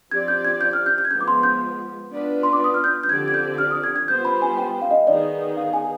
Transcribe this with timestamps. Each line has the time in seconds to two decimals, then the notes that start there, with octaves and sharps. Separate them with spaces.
0.11 F3 C4 G4 D5 G#6
0.28 G6
0.45 G#6
0.61 G6
0.73 F6
0.86 G6
0.98 G6
1.05 G#6
1.10 F3 G#3 B3 G6
1.21 D6
1.28 C6
1.43 G6
2.10 B3 D4 F4 B4 D5
2.43 C6
2.53 D6
2.64 D#6
2.74 F6
2.84 G6
3.03 G6
3.09 D3 F3 C4 G4 D5 G#6
3.28 G#6
3.34 G6
3.58 F6
3.71 D#6
3.84 G#6
3.96 G#6
4.08 G3 B3 F4 C5 G6
4.25 B5
4.42 G#5
4.58 G5
4.82 F5
4.91 D#5
5.07 D#3 B3 D#4 G#4 D5
5.57 F5
5.73 G#5